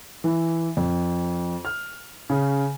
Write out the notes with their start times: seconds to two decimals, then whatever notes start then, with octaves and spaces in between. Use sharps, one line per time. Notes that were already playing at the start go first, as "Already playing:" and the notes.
0.24 E3
0.77 F2
1.65 F6
2.30 C#3